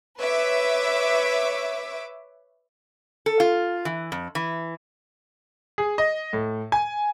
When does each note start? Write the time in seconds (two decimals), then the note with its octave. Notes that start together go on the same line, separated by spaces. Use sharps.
0.19 B4 C#5 E5 D6 E6
3.26 A4
3.40 F4
3.85 E3
4.12 F2
4.35 E3
5.78 G#4
5.98 D#5
6.33 A2
6.72 G#5